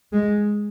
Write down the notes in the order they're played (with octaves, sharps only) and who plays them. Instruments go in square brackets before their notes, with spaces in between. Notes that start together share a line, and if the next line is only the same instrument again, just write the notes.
[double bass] G#3